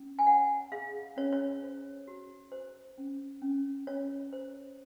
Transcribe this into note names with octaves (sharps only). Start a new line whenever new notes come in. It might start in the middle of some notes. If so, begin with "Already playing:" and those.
Already playing: C#4
G#5
C#5 F#5
G#4 F5
C#4 C#5
C#5
C5
F#4
C5
C#4
C#4
C#4 C#5
C5